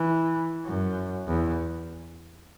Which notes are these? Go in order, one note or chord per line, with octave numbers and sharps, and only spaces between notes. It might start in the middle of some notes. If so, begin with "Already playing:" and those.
Already playing: E3
F#2
E2